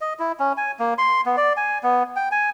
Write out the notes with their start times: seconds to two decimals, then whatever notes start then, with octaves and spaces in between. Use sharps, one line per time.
0.01 D#5
0.19 E4
0.39 C#4
0.57 G#5
0.79 A#3
0.98 C6
1.26 B3
1.37 D5
1.57 G#5
1.83 B3
2.16 G5
2.31 G#5